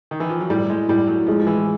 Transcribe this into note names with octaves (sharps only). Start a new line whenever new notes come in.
D#3
E3
F3
F#3
A2 G3
G#3
A2 G3
F#3
F3 G#3
F3
E3